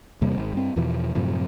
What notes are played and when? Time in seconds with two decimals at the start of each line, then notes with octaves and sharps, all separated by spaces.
0.21 E2 C3 G3 A#3
0.37 G#1
0.53 G2 C4
0.76 E2 B2 E3 F3
1.15 F#2 A2 C3 F3